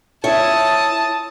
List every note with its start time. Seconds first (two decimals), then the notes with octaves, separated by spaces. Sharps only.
0.24 E4 C#5 A5 D#6